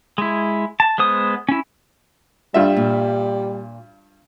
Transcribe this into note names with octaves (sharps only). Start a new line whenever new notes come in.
G#3 E4
A5
G#3 B3 C5 D#6
C#4 E4
G2 G3 F4 E5
A#2